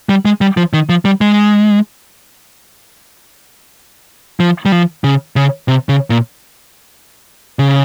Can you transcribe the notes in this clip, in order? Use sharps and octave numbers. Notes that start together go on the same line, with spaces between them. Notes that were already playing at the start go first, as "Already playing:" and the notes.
G3
G#3
G3
F3
D#3
F3
G3
G#3
F3
G3
F3
C#3
C#3
C3
C#3
A#2
C#3